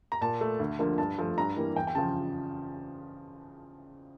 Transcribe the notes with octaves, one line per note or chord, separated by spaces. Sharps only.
A#5
A#2 A5
A3
D2
D3 F3 A#3
G2 A5
F3 A3
G2 A#5
E3 G3 A#3
E2 G5
G5
C#3 F3 A5